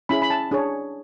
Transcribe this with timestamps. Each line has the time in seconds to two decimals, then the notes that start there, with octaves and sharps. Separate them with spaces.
0.09 C#4 E4 G#4 B5
0.22 B5
0.30 A5
0.51 D4 G#4 C#5